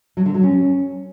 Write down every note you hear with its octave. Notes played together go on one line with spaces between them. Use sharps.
F#3
D3
F#3
C#4